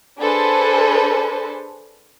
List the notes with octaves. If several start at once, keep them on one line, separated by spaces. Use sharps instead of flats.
D4 G#4 A4 B4 C5